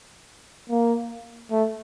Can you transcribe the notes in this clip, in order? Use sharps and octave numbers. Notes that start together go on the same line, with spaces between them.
A#3
A3